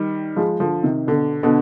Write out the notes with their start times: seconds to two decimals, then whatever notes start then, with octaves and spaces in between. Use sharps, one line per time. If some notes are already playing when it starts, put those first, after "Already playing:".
Already playing: D#3 G3
0.36 F3 G#3
0.60 D3 F3
0.83 C3 D#3
1.07 B2 D3
1.43 B2 D3